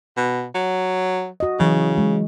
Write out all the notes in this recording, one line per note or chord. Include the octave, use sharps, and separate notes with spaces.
B2
F#3
F#4 D#5
C#3 E3 F#3
G#3